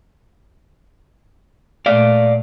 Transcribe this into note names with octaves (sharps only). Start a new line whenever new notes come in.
A#2 A3 D5 F5